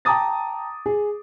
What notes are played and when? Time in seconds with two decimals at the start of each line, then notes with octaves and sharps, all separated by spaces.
0.05 G5 A5 A#5 D6 D#6 A6
0.86 G#4